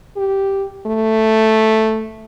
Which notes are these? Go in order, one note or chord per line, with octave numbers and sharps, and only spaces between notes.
G4
A3